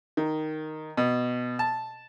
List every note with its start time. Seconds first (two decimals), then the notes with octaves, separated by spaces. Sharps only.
0.17 D#3
0.97 B2
1.59 A5